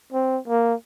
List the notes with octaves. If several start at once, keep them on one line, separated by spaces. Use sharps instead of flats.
C4
A#3